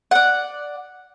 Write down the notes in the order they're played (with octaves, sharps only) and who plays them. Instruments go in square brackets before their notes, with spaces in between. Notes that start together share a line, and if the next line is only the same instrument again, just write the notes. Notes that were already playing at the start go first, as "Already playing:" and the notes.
[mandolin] D5 F#5